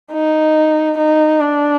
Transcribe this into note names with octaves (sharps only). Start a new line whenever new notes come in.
D#4
D#4
D4